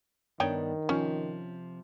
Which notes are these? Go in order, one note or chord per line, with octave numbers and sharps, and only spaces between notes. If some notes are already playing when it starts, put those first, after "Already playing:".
G2 D#3 B3 D4 D#4 C#5 G5
C3 F3 C#4